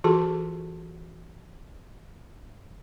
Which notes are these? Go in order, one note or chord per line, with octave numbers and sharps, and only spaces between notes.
E3 F4 F#4 G#4 A4 A5